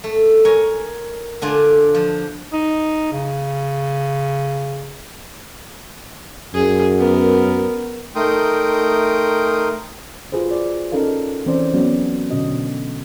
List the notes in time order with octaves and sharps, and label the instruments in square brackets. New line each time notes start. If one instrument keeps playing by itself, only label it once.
[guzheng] A3
A#4 C#5 G#5
D3 D4 F4 D5 G#5
F3
[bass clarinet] D#4
C#3
[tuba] F#2 [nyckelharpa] G#4
[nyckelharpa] B3 A#4
[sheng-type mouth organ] A3 D#4 A#4 G5 C6 D#6
[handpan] F4 F#4 G#4 B4 C5
D5
C#4 D#4 A4 A#4 F5
E3 C4 C#4 C5 D5
F#3 B3 C#4 F#4 D5
B2 D3 C#4 F#4 D#5